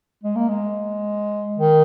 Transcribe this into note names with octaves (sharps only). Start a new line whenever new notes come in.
G#3
A#3
G#3
D#3